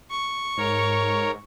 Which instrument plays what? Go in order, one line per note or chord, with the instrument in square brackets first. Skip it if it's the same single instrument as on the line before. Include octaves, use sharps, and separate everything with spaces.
[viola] C#6
[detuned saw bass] G#2 [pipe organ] A#4 C#5